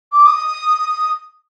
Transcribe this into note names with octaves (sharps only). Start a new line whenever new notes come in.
D6
D#6